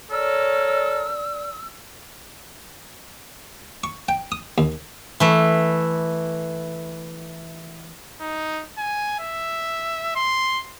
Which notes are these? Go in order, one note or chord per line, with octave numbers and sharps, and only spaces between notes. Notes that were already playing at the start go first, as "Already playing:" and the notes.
A4 A#4 C#5 D5 E6
C#6
G5
D#6
D#2
E3 A3
D#4
G#5
E5
C6